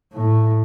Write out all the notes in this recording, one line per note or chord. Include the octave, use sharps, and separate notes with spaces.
A2